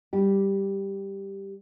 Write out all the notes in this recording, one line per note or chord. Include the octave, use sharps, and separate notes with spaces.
G3 G4